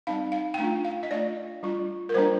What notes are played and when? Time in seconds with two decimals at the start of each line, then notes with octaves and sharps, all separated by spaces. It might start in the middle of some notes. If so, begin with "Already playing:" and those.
0.07 G3 C4 D#4 F5
0.32 F5
0.54 G5
0.58 A3 D4 F4 F5
0.85 F5
1.03 D#5
1.11 A3 D4 F4 D5
1.63 G3 D4 F4
2.09 A#4
2.14 G3 A#3 D4 F4 C5